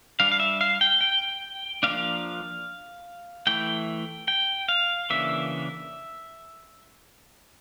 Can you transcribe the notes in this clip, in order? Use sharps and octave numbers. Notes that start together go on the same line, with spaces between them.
G3 D4 F5
F5
E5
F5
G5
G5
F3 A#3 D4 F5
E3 A3 E4 G5
G5
F5
C#3 E3 A#3 D4 E5